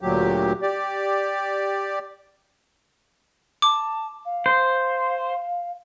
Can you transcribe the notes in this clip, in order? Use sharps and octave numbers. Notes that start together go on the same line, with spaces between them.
D2 A#2 F#3 G4
G4 D5
A5 D6
F5
C5